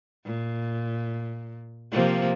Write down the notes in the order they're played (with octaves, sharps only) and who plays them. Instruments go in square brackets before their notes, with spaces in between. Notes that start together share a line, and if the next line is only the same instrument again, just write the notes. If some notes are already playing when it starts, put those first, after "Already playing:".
[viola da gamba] A#2
C3 F3 A#3